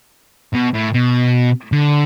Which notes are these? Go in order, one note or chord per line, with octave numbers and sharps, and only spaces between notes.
B2
A2
B2
D3